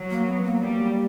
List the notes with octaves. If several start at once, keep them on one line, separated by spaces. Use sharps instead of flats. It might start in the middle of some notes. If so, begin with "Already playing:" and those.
Already playing: F#3
A#3
B3
A#3
G3